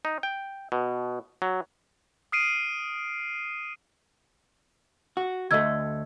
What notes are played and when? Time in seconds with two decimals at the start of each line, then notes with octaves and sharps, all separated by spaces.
0.05 D#4
0.23 G5
0.72 B2
1.42 F#3
2.32 D#6 F6 C7 D7 D#7
5.17 F#4
5.51 D2 A3 D#5 E6 G#6